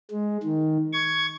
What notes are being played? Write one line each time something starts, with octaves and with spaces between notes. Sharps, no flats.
G#3
D#3
C#6 G#6